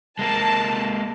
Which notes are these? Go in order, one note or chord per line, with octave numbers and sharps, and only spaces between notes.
G#3 A#3 A#4 A5